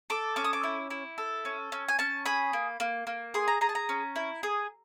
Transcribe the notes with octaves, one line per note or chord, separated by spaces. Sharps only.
A4 D6
C#4 D6
D#6
D6
E4
E4
A4
C#4
C#4
G#5
C#4 A5
G#4 B5
A#3
A#3
A#3
G#4 C6
A#5
G#4 A#5
A5
A#5
C#4
E4
G#4